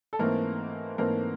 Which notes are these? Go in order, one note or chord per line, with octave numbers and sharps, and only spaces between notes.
A4
G#2 E3 A3 A#3 C4 A#4
G#2 E3 A3 A#3 C4 A#4